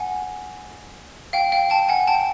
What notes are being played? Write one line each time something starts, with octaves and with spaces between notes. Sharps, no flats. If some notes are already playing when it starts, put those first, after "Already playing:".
Already playing: F#5 G#5
F5 G5
F5 G5
G5 A5
F#5 G#5
G5 A5